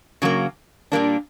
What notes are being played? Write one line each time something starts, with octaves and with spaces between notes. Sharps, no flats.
C#3 F#3 A#3
A#2 G3 A#3 D4